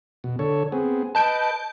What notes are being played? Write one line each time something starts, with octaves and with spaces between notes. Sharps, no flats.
B2
D3 A4 C#5
B3 C4 G#4
B4 D#5 A5 G6 D7